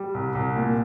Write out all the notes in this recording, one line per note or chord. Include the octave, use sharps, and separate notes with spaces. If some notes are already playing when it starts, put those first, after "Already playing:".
Already playing: G3
C2
C2
A#2